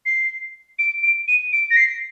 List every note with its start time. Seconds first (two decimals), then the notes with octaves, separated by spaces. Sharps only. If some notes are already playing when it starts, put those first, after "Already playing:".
0.06 C7
0.79 D7
1.03 D7
1.28 D#7
1.53 D7
1.70 A#6
1.77 C7